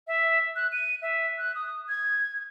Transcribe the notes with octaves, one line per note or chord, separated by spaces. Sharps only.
E5
F#6
D#7
E5
F#6
D#6
G#6